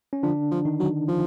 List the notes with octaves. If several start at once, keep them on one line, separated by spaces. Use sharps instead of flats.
C#4
D3 F3 D4
F3
D#3 D#4
F#3
F3